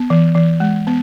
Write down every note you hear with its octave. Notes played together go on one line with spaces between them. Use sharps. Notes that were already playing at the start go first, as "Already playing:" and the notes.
Already playing: B3
E3
E3
G#3
B3